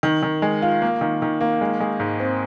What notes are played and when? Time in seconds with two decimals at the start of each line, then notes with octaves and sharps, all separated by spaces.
0.03 D#3
0.23 D#3
0.42 G#3
0.62 F4
0.82 A#3
1.01 D#3
1.22 D#3
1.40 A#3
1.61 G#3
1.80 G#3
2.00 G#2
2.20 C4